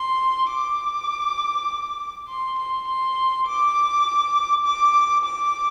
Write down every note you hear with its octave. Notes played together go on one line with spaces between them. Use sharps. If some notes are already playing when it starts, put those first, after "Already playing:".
Already playing: C6
D6
C6
C6
C6
D6
D6
D6